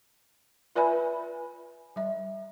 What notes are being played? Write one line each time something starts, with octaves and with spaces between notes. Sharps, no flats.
F4 B4 D5 E5 G#5 B5
G3 E5